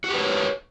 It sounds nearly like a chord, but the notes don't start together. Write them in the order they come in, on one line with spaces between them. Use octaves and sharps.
F#4 G4 B4 C#5